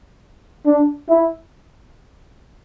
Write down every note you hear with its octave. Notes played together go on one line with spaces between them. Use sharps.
D4
E4